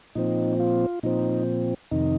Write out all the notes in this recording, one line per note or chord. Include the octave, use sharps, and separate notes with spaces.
A#2 F3 C4 D#4
F4
A#2 F3 C4 D#4
F2 C3 D#3 D#4